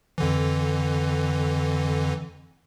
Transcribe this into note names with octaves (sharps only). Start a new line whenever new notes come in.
F2 D3 E3